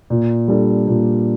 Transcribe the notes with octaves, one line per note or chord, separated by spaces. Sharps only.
A#2
G3 D4 A4
A#2